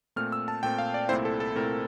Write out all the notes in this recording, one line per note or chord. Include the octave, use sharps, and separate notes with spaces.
A#2 A3 C4 F6
E6
A5
A#2 A3 C4 G5
F5
D5
C2 A#2 A3 C4 E4 C5
A4
A4
C2 A#2 A3 C4 E4 A#4